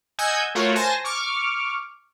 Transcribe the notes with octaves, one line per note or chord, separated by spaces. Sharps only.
D#5 F#5 G#5 E6 G6 G#6
A3 F4 F#4 A#4 C#5
C5 G#5 A5 A#6
C#6 D6 F6